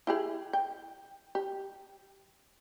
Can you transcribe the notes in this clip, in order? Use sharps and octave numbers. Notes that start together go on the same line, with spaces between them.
E4 G4 G#4
G5
G4